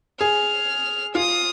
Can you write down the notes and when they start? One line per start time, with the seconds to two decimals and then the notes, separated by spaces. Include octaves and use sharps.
0.21 G#4 F6
1.15 F4 D#6